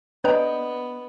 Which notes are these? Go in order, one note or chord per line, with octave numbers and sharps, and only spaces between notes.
B3 D4 B4 C#5 D#5 G5 A#5